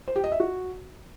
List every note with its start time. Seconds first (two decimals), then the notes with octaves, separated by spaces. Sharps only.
0.08 C5
0.16 G4
0.24 D#5
0.32 E5
0.40 F#4